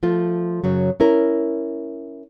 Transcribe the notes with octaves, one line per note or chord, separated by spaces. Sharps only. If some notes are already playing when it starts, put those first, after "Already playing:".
F3 A3 F4
F#2 C#3 F#3
C#4 E4 A#4